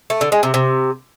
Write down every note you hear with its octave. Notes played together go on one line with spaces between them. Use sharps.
A3
D3
G#3
C3
C3